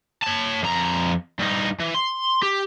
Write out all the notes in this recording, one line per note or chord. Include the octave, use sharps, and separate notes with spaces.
C#5 A5
F2 A#5
G2 D#4
E3
C6
G4